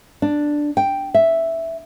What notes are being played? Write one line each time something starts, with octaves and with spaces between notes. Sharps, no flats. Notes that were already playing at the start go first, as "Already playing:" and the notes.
D4
G5
E5